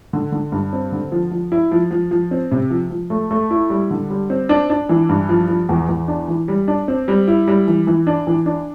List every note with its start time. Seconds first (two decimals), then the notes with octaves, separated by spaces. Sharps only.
0.13 D3
0.32 D3
0.52 G2
0.73 C4
0.92 D3
1.12 F3
1.31 F3
1.52 E4
1.72 F3
1.91 F3
2.11 F3
2.31 C4
2.51 C3
2.70 F3
2.91 F3
3.10 A3
3.31 A3
3.51 E4
3.70 G3
3.90 D3
4.10 G3
4.30 C4
4.49 D4
4.70 D4
4.89 E3
5.09 G2
5.29 F3
5.48 F3
5.69 E2
5.89 E2
6.08 D4
6.28 E3
6.48 G3
6.68 D4
6.88 C4
7.08 G3
7.28 E4
7.48 G3
7.67 E3
7.87 E3
8.07 D4
8.27 E3
8.46 D4